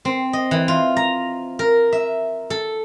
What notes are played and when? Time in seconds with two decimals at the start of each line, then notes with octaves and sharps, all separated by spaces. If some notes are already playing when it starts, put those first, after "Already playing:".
0.05 C4
0.33 D#5
0.51 E3
0.68 F4
0.97 A#5
1.59 A#4
1.92 E5
2.50 A4